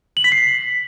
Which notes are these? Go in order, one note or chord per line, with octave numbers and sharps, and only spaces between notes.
F#7
B6
C7